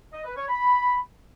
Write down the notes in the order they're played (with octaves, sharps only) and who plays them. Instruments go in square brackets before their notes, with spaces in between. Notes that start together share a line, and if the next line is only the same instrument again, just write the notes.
[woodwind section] D#5
B4
C#5
B5